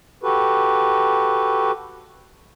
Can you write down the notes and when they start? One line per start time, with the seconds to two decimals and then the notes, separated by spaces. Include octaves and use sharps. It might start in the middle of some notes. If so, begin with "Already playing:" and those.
0.23 F#4 G4 A4 B4